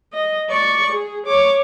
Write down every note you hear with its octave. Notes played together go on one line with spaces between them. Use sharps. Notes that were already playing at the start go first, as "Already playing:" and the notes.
D#5
D5 C#6
G#4
C#5 D6